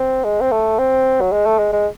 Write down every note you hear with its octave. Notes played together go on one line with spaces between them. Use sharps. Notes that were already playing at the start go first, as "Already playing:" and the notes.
Already playing: C4
G#3
C4
A3
C4
F#3
G#3
A3
G#3
G#3